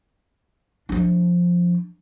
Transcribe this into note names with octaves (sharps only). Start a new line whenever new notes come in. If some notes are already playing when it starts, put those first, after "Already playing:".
F3 D4